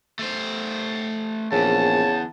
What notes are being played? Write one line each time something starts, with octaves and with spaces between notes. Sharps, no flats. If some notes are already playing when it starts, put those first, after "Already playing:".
A3 C5
A#1 E2 C#3 A5